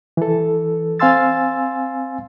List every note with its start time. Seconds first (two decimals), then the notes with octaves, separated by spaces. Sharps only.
0.17 E3 A4
1.00 C4 F5 G#5 C6 E6 A6